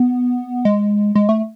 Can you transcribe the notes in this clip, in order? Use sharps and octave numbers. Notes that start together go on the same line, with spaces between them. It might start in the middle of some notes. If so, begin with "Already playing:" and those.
Already playing: B3
G#3
G#3
A3